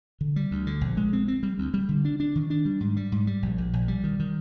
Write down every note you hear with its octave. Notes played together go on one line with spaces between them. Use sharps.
D3
G3
D2
D3
A#1
G#3
C4
C4
G3
D2
G3
D3
D4
D4
D#3
D4
G3
G#2
G3
G#2
G3
A#1
A#1
A#1
G3
D#3
D#3